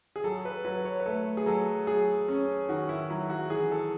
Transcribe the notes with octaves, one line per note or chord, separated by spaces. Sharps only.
G#4
F#3 A4
B4
F#3 B4
C#5
B4
A3 A4
G#4
F#3 A4
F#3 G#4
C#4
D#3 F#4
E4
F#3 E4
F#4
E3 G#4
A4